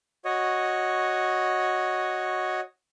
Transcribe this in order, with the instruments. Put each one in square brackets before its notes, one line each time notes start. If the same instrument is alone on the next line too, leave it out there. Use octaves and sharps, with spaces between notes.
[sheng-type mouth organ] F#4 C#5 D#5